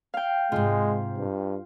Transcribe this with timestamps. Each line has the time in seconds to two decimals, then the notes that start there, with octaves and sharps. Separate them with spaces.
0.14 F5 G5
0.52 G#2 C3 G#3 F4
1.18 G2